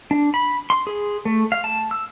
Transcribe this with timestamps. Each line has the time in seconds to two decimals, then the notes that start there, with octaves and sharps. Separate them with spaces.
0.11 D4
0.34 B5
0.70 C6
0.87 G#4
1.25 A3
1.52 F5
1.64 A5
1.91 E6